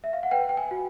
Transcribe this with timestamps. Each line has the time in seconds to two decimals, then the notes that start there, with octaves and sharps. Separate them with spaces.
0.04 E5
0.13 F5
0.23 F#5
0.31 B4 G5
0.49 G5
0.57 G#5
0.71 F#4